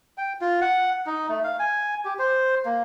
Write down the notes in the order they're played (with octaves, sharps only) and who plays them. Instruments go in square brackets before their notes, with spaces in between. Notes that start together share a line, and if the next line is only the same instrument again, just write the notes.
[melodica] G5
F4
F#5
D#4
A3
F5
G#5
G4
C5
A#3